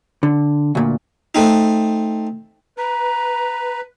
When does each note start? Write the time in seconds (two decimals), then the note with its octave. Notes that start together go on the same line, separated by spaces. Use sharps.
0.23 D3
0.75 D2 A#2
1.35 A3 C4 D#4
2.78 B4 A#5